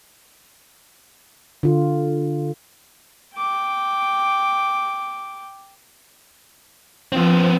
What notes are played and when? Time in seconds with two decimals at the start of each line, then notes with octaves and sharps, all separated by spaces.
1.63 D3 F4
3.36 G5 D6
7.12 F3 B3 C4